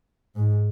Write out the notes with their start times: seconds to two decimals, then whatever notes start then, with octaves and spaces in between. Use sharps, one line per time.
0.36 G#2